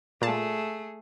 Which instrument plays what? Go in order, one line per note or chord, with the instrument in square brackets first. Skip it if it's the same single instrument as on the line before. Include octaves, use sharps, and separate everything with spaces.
[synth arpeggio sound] A#2 A5 [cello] A3 G#4